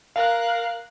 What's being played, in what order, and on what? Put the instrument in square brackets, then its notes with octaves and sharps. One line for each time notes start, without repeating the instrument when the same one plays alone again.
[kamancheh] A#4 F#6 [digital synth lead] F5